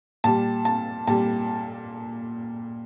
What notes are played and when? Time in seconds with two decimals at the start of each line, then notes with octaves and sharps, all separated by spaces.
0.24 A#2 G3 A5
0.65 A5
1.07 A#2 G3 A5